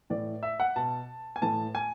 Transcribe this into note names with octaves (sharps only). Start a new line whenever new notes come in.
A2 E3 D5
E5
F#5
B2 A5
G#5
A2 E3 A5
G#5